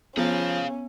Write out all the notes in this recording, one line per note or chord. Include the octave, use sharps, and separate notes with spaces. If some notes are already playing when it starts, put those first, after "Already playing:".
F3 B3 C#4 G#4 F5